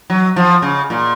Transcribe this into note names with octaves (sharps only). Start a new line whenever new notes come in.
F#3
F3
C#3
A#2